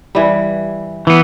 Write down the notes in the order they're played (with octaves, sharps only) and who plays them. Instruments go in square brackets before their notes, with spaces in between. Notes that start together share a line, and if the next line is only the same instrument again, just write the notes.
[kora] E3 G3
[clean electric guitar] E3 B3